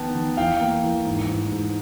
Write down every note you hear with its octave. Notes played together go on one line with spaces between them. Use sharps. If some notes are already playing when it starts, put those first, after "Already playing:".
Already playing: D#3 B3 G5 A5
D#3
E3 F5 G5
A#3
E3
G#2
G#2
G#2